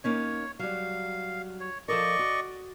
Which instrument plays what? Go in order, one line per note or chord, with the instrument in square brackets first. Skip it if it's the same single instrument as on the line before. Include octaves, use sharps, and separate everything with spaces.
[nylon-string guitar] A#3 C#4 D#4 [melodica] C#5
[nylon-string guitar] F#3 G3 [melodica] F5
[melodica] C#5
[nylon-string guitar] F3 A4 A#4 [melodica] D5 D#5 C#6
[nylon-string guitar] F#4